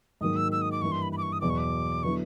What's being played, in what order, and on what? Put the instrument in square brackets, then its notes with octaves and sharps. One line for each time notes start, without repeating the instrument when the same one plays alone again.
[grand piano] G#2 D#3 F#3 A#3 [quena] D#6
[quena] E6
E6
D#6
D6
[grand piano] G2 E3 G3 A#3 [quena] C#6
[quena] C6
B5
B5
D6
C#6
D#6
[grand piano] E2 B2 F#3 [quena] D6
[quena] C#6
D6
[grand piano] D3 F#3 B3 E4 [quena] C#6